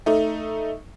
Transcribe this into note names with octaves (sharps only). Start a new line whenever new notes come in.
A3 D#4